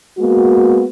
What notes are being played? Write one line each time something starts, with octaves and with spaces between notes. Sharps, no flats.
G#3 A#3 B3 F#4